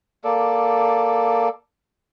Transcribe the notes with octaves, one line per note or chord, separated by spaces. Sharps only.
A#3 A4 D5